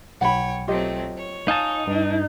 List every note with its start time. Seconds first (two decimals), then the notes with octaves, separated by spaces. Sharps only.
0.21 B1 C#5 F#5 G5 B5
0.68 F#3 A3 C4 F4 G4 D#5
1.17 C#5
1.48 D#4 F5 G#5 A5
1.87 G2 D4